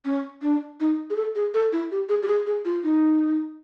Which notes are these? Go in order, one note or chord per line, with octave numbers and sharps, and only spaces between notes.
C#4
D4
D#4
G#4
A4
G#4
A4
E4
G4
G#4
G4
G#4
G#4
F4
D#4